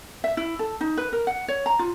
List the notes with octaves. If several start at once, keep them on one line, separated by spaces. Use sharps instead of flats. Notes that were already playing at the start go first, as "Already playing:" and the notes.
E5
E4
A4
D#4
B4
A#4
F#5
C#5
A#5
F4